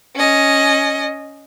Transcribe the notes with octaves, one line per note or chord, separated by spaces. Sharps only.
C#4 D#5